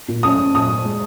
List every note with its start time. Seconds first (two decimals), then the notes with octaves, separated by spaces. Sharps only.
0.08 A#2
0.23 C#4 D#6
0.39 C#4
0.54 A#2 D#6
0.70 A#2
0.85 G#3